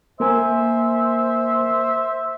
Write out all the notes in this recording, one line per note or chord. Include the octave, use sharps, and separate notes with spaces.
A#3 A#4 C5 E5 G#5